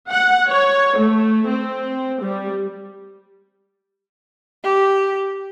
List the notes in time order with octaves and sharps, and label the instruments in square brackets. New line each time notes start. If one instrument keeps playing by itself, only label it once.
[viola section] F#5
C#5
A3
C4
G3
[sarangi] G4